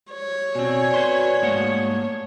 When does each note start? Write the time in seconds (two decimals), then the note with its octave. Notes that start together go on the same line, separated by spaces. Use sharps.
0.12 C#5
0.55 B2 C4 F#4 D5 G#5
0.94 B4 C6
1.42 G#2 A3 A#3 F#5